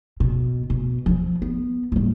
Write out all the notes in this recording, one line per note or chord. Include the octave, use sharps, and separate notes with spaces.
B2
B2
F3 C4
B3
A1 G3